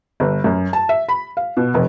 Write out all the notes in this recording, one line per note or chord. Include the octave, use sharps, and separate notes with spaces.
G1
F#2
A5
E5
B5
F5
B2
F1